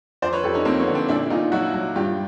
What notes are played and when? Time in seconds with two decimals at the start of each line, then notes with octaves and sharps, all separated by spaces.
0.22 F2 C5 D5
0.33 B4 C#5
0.44 F2 G4 A4
0.54 C#4 D#4
0.65 F2 A#3 C4
0.80 B3 C#4
0.87 D3
0.94 C4 D4
1.09 A#2 D4 E4
1.30 A#2 D#4 F4
1.52 F#3 E4 F#4
1.74 F#3
1.96 G2 F4 G4